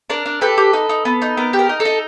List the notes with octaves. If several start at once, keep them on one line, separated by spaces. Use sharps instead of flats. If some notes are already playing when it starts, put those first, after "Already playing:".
D4 A#4
D4
G4 A4 B4
G4
D#4
D#4
B3
D#4
B3 A#4
G4
A#4
D#4
A4
D#4